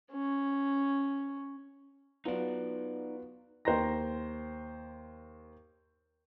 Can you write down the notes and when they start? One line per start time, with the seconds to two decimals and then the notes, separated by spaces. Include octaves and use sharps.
0.11 C#4
2.25 F#3 B3 D#4 F4 D5
3.65 D#2 C5 G5 A#5 C6 A#6